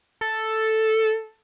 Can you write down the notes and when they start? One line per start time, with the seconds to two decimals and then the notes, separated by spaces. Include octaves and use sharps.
0.21 A4